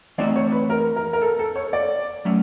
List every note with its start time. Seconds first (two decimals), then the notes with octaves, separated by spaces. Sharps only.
0.18 E3 A3 C4 D#4 F#4 D5
0.36 C#5
0.52 B4
0.70 A#4
0.96 A#4
1.13 A#4
1.22 A4
1.39 A4
1.56 C#5
1.73 D5
2.25 F#3 A3 C#4